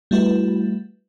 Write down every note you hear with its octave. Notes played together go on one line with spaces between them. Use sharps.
G3 A3 E4 F#4 B4